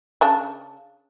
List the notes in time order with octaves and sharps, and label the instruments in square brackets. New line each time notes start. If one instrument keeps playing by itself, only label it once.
[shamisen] C#3 D4 A5